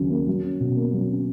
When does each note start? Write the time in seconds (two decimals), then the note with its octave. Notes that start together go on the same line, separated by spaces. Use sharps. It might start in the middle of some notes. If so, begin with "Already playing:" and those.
Already playing: D#2 C#3 F#3
0.10 A#3
0.27 F#3
0.43 C#4
0.60 B2
0.76 A#3
0.93 F#3
1.10 C#4